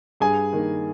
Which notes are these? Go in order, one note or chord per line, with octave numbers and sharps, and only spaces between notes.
G2 G#4 G#5
D#3 A#3